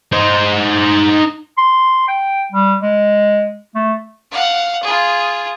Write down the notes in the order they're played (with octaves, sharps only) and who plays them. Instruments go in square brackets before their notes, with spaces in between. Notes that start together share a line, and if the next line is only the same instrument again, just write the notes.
[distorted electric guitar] D#4 C5
[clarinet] C6
G5
G3
G#3
A3
[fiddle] F5 F#5
F4 G#4